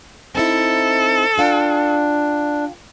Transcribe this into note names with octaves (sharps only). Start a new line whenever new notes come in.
C4 D#4 E4 A4
D4 F4 F5 G5